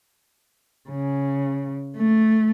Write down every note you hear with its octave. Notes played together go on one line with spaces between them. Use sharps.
C#3
A3